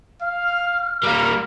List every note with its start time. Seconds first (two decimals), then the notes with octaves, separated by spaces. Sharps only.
0.21 F5 F6
1.03 G3 A#3 A#4